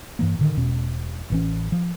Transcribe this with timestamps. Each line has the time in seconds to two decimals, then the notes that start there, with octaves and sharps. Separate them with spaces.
0.19 G2 E3 A#3
0.39 A2 D3 D#3
0.57 E1 B2 C#4
1.30 A1 E3 C#4
1.72 F3